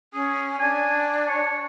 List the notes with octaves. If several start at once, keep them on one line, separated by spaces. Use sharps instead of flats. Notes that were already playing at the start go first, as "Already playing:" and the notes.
C#4 G#4
D4 G#5
C#5